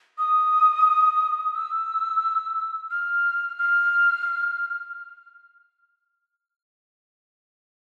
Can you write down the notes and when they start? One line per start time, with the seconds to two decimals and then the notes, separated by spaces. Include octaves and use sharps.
0.18 D#6
1.54 E6
2.91 F6
3.58 F6